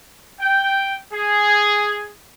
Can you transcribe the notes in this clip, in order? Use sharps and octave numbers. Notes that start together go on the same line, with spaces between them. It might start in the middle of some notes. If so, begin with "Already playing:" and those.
G5
G#4